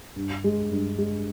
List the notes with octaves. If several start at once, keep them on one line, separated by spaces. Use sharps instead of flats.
G2
G#3
G2
G#3